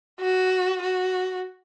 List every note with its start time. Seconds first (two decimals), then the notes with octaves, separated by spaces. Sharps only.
0.20 F#4
0.82 F#4